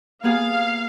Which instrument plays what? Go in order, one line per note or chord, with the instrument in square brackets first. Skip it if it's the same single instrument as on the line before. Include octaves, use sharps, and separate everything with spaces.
[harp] A#3 B3 G#4 [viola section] F5